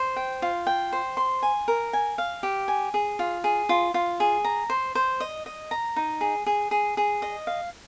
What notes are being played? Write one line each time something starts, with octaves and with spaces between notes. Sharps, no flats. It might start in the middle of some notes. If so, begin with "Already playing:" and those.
Already playing: C5
G5
F4
G5
C5
C6
G#5
A#4
G#5
F5
G4
G#5
G#4
F4
G#4
F4
F4
G#4
A#5
C5
C5
D#5
D#5
A#5
D#4
G#4
G#4
G#4
G#4
D#5
F5